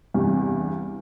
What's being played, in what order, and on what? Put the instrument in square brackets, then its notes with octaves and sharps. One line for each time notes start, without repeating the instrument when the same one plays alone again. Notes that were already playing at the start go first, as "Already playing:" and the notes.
[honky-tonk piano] E2 G2 C3